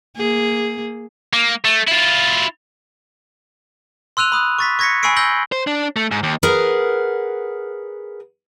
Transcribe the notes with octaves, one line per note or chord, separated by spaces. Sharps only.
A#3 G#4
A#3
A3
E4 F4
C6 E6 F#6 D#7 F7
B5 D#6 F#6
C#6 A6 B6
C#6 G#6 A#6 B6 C#7
G#5 B5 C#6 E6 C7 D7
E6 G6 A#6 F#7 G7
C5
D4
A3
G#2
D#2
G#4 A#4 B4 F#5